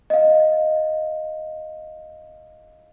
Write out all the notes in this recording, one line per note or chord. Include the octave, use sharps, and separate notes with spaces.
D#5 F5